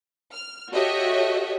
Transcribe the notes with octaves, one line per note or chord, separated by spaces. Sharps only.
F6
F#4 G4 A4 C#5 D#5 E5